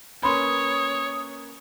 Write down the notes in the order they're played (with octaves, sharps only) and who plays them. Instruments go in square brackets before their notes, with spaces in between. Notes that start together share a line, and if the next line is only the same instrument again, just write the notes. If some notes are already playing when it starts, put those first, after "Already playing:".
[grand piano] A#3 C#4 B4 [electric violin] C#5 [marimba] B5 C6 [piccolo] D#6